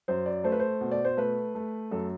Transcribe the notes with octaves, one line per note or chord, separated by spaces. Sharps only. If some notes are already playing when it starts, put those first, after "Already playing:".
F#2 C5
D5
A3 C5
B4
C5
B2
D5
C5
A3 B4
A3
F#2 A4